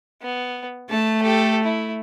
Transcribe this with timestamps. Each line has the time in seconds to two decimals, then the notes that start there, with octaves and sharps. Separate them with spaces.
0.22 B3
0.90 A3 A5
1.22 G4 A4
1.64 E4